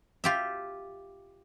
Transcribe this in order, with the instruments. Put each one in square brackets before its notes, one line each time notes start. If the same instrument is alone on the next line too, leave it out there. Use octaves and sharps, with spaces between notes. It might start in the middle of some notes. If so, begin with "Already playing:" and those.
[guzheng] F4 G4 E5